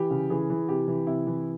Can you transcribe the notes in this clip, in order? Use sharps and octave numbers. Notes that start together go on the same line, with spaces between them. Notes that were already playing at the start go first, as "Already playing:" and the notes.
Already playing: E3 G4
C#3
E3 G#4
E3
C3 G4
E3
C3 E4
E3